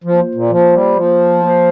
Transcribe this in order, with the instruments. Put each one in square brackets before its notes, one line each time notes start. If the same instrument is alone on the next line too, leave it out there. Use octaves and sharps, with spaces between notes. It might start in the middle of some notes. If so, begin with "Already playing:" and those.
[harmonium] F3 [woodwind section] A#3 F4 C5
[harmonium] A#2
[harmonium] F3 [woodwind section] A#3 F4 C5
[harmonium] G3
[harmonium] F3 [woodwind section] A#3 F4 C5
[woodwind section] A#3 F4 C5